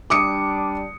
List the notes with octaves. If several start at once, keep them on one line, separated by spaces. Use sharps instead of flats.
G3 D4 D6 D#6 C#7